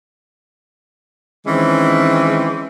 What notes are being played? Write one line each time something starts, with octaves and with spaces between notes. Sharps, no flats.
D#3 E3 G#3 C4 C#4